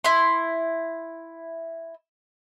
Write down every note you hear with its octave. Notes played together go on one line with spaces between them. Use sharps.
E4 C6